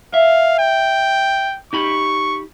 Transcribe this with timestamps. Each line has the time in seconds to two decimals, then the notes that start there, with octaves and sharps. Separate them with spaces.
0.14 E5 F5
0.59 G5
1.73 D#4 G4 B5 C#6